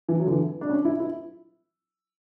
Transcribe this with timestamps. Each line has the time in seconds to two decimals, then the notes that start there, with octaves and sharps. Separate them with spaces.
0.09 E3
0.20 F#3
0.26 D3
0.31 E3
0.61 D4
0.69 C#4
0.85 E4
1.00 E4